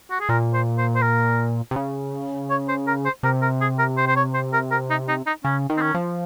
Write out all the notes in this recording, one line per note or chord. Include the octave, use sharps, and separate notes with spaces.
F#4
G#4
A#2 A#4
C5
C5
C5
A#4
C3
C#3
C#5
C5
A#4
C5
C3 A#4
A#4
G#4
A#4
C5
C5
C#5
C5
A#4
A#4
D#4
D#4
D#4
C#3 C#4
D#3
C4
C#4
F3